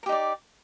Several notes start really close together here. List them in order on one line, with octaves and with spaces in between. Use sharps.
A#4 G4 D#4 D5